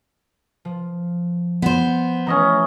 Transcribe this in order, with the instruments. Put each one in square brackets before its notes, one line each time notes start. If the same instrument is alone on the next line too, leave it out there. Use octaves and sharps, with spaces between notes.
[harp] F3
[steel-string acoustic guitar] B3 C5
[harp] E3 A3 [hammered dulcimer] C#4 D#5 A#5